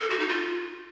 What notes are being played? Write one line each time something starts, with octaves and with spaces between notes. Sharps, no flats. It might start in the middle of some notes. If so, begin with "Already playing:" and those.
A4
F#4
D#4
F4